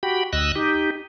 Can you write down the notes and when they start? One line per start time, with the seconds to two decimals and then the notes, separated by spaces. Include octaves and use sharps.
0.03 F#4 G4 G5 B5
0.33 D2 D#5 E6 F#6
0.56 D#4 G4